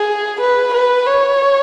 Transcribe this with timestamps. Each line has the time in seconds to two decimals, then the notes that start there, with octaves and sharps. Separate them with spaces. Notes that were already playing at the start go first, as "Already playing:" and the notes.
Already playing: G#4
0.41 B4
0.74 B4
1.07 C#5